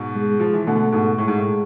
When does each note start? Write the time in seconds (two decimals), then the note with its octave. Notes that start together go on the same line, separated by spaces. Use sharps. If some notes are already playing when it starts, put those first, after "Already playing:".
Already playing: G#2 B2
0.16 G#3
0.40 F3
0.53 E3
0.67 B2 D3 A3
0.92 G#2 B2
1.18 A2 G#3
1.28 G#2
1.38 A2